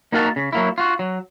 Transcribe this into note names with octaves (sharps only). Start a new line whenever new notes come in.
A#3 D#4 F#4 A#4 F5 A5
C#3
F#3 A#3 E4
F4 F#4
F#3